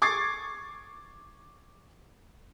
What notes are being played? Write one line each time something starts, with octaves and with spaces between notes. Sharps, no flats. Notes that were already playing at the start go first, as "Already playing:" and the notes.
C#6 D6 G#6 A6 C7